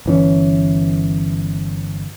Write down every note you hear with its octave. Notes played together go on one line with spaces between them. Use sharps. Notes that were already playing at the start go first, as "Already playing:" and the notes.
G1 E3 C#4